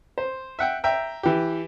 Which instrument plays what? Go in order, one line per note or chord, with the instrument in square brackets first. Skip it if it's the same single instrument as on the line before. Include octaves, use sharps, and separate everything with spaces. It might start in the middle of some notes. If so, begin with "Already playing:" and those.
[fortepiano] C5
E5 F#5 G5
E5 G5 A#5
E3 G4